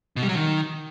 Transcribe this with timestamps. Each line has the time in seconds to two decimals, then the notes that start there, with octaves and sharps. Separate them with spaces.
0.16 B2
0.23 G3
0.29 F#3
0.35 D#3